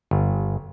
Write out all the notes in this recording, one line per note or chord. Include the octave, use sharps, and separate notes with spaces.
G1